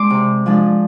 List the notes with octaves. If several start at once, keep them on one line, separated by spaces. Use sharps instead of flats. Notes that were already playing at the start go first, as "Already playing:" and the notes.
Already playing: G#3 D4 C6 D6
C3
F3 G#3 D4